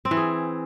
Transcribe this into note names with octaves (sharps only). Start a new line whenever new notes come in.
C4
E3
G#4